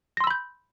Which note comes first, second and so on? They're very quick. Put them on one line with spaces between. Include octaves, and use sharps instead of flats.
A#6 C6 E6 B5 G6